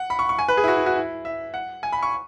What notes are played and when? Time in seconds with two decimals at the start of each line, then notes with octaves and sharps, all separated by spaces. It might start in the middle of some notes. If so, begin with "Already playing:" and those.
Already playing: F#5
0.10 B5
0.19 C#6
0.29 C#6
0.39 G#5
0.48 B4
0.57 G#4
0.64 E4
0.68 F#4
0.77 E4
0.86 F#4
0.96 E4
1.25 E5
1.54 F#5
1.83 G#5
1.92 B5
2.03 C#6